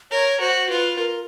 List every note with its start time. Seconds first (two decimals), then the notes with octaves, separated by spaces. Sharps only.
0.11 A#4 C#5
0.40 F#4 C5
0.69 F4 B4
0.98 A#4